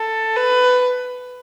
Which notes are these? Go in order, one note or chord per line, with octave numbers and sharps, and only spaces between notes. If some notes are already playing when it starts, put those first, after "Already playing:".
Already playing: A4
B4